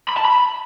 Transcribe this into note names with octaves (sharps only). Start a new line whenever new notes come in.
B5
A5
B5